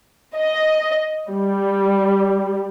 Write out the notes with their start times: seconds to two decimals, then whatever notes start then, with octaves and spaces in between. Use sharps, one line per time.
0.35 D#5
1.29 G3